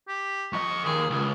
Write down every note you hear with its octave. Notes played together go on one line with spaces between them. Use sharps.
G4
F2 D#5 C#6
D#2 G#4
C#2 G#4